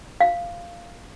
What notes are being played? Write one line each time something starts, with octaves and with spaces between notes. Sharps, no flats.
F5